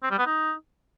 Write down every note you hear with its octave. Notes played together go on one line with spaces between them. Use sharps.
C4
G3
B3
D#4